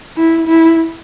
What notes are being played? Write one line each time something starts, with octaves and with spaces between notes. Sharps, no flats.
E4
E4